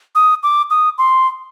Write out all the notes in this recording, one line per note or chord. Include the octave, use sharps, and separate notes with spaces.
D#6
D6
D#6
C6